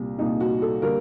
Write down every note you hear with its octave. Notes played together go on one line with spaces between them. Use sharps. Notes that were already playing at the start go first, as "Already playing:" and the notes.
Already playing: C2 A#2 G3
C2 A#2 G3 D#4
F#4
A4
D3 G3 A#3 A#4